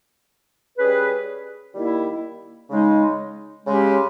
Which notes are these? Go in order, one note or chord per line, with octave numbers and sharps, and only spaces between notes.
G3 C#4 G#4 B4
D#3 G3 A#3 E4
C#3 G#3 D#4
C#3 G#3 C#4 G4